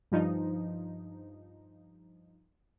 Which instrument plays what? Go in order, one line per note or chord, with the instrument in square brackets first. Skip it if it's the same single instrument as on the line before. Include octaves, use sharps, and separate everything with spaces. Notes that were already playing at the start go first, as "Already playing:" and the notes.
[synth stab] G2 F3 D#4